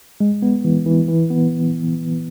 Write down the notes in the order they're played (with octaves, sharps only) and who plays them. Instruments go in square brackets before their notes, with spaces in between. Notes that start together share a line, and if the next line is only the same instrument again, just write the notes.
[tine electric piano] G#3
B3
E3
E3
E3
B3